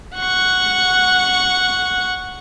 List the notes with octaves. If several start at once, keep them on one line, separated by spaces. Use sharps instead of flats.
F#5 C#6